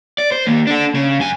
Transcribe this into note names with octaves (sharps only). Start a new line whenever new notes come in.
D5
C5
D#2 A#3
D4 A4
C#3
F#2 G#5